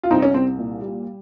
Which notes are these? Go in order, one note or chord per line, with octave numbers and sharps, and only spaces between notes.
F4
C2 C4 D#4
C#4
C2 C4
A#2
G3